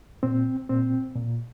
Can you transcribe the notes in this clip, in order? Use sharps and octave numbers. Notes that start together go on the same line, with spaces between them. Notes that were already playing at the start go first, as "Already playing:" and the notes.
A#2 C4
A#2 C4
A#2